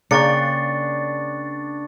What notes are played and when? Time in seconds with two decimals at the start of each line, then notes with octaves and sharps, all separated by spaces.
0.11 C#3 A#3 D4 G5 C#6 A6 C#7